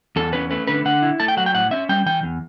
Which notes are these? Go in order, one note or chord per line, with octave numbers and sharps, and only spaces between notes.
E2 A4
C#4 B4
A3 B4
D3 B4
D3 F#5
E4
A3 A5
G5
F#3 F#5
G5
A2 F#5
C#4 E5
G3 G5
E3 G5
E2